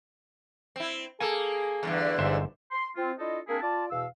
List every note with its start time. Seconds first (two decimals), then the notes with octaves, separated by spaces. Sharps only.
0.76 C4 E4
1.20 A#3 G#4 A4 G#5
1.83 E2 G2 D3
2.19 G1 G#2 C5 E5
2.72 C6
2.97 C4 F4
3.19 D4 E4 F4 A4 D#5
3.48 A#3 C4 D4 E4 G#4 A#4
3.62 F4 D5 A5
3.90 E2 B2 F5 E6